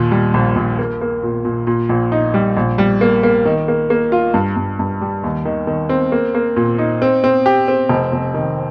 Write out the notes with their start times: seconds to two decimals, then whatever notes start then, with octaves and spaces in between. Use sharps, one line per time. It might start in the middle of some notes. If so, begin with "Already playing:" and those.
Already playing: D#2 A#2
0.11 G3
0.34 A#1
0.56 A#1
0.79 A#3
1.01 A#3
1.23 A#2
1.45 A#2
1.67 A#2
1.89 A#1
2.12 D#4
2.34 G3
2.57 A#1
2.78 G3
3.01 A#3
3.23 A#3
3.45 D#3
3.68 A#3
3.90 A#3
4.12 F4
4.34 G2
4.57 G2
4.79 G2
5.01 G3
5.24 D#2
5.45 D#3
5.67 D#3
5.89 C4
6.12 A#3
6.35 A#3
6.56 A#2
6.78 D#4
7.02 C4
7.24 C4
7.46 G4
7.68 C4
7.89 F1
8.12 F1
8.34 D#3